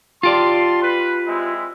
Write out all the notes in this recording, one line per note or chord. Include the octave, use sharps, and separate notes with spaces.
F4 G4 D5 A5 C6
B4
G#3 C4 E4